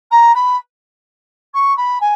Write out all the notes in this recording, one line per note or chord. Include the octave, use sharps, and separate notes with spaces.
A#5
B5
C#6
B5
G#5